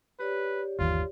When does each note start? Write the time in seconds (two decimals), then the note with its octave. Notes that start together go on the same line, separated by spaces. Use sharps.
0.19 G4 B4 C#5 D5
0.79 G1 D#2 E3 F4